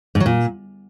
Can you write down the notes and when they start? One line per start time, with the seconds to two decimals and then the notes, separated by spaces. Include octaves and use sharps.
0.15 G#2
0.20 F#3
0.26 A#2